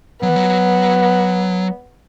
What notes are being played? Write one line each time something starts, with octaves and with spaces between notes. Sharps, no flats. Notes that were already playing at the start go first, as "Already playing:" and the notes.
F#3 B3
E3
F#3